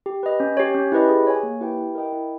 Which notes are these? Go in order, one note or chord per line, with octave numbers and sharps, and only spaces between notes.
G4
B4 D#5
C#4
G4 C#5
C#4
E4 G4 B4 D#5
G#4
C#5 G#5
A#3
E4 G4 B4 G5
E4
A#4 D#5 G5
E4